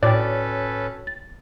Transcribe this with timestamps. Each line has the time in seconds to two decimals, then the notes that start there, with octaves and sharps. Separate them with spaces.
0.03 A2 C#4 F#4 A4 B4 C#5 D5 G5
1.07 A6